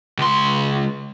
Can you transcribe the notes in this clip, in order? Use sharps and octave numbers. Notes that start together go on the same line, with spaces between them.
C#2 C6